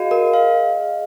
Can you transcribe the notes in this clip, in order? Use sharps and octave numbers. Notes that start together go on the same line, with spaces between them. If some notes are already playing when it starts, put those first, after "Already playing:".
Already playing: F#4 G#4 D#5 F5
A#4 D#5
F5